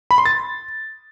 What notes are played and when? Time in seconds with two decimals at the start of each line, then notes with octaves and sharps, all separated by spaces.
0.11 B5
0.18 C6
0.26 A6